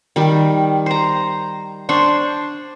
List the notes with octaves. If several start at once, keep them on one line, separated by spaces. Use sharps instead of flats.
D#3 G3
C5 A#5
D4 C5 C#6